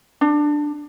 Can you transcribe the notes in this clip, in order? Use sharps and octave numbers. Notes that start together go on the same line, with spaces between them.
D4